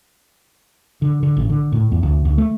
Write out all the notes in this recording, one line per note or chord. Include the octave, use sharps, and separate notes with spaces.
D3
D3
A1
D3
A2
E2
D2
D2
A3